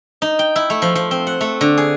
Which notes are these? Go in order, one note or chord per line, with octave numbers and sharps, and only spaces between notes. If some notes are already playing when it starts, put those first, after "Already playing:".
D#4
G5
E4
A3
F3
F3
C4
F#5
A3
D3
G#4